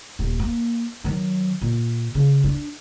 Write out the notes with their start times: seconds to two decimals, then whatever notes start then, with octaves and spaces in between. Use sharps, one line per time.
0.19 D#1
0.39 A#3
1.04 D#3 F#3
1.62 A#2
2.15 C#3
2.44 D4